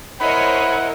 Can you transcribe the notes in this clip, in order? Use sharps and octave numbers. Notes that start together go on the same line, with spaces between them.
E4 A#4 C5 C#5 D#5 F#5 B5